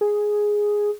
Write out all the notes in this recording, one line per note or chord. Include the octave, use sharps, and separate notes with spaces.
G#4